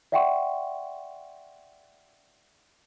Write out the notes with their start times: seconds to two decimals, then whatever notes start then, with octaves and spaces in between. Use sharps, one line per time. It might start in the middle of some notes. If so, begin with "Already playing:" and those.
0.12 D5 E5 F#5 G5 C6 C#6